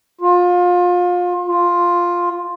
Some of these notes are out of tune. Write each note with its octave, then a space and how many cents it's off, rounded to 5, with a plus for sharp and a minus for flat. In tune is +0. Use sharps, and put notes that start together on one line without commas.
F4 +30
F4 +5